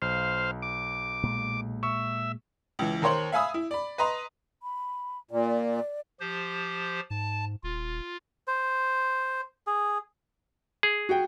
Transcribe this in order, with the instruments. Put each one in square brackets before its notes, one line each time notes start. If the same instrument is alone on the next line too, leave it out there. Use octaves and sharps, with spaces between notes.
[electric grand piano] B1 [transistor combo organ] C5 F5
[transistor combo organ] D6
[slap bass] A#2 G#3
[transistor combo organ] E5 [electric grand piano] C#6
[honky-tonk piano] C#2 E3
D#2 A#4 C5 C#5 C6 F#7
E5 F5 G#5 B5 D#6 E6
E4
D5 B5
B4 D#5 A#5 C6
[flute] B5
[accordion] A#2 [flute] D5
[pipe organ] F3 G4 C5
[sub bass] G#2 [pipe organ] A5
[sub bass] D#1 [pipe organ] F4
[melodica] C5
G#4
[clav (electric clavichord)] G#4
[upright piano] F#4 G5